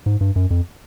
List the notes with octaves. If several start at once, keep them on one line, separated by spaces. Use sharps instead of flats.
G#2
G2
F#2
F2